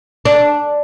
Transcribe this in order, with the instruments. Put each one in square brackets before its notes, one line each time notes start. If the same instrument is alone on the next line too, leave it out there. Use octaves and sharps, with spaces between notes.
[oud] D4